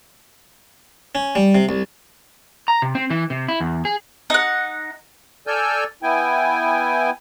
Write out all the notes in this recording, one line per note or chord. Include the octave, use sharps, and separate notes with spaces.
C#4
G3
C3
C2
A#5
C3
C4
E3
C3
E4
E2
G#4
D#4 F#5
A4 D5 G#5 E6 F6 G6
B3 E4 G5 G#5